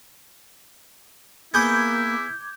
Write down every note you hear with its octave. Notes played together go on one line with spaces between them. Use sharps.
A#3 B3 E4 G#4 B4 D6 G6 G#6